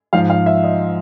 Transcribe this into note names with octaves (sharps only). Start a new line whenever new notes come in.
G#2 F3 F5
F5
E5
D#5